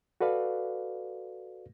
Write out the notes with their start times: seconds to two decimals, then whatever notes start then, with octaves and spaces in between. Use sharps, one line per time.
0.21 F#4 A4 B4 D5 F5